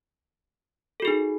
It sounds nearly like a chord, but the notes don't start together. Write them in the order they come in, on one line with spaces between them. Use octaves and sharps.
A4 F#4 G#4 D#4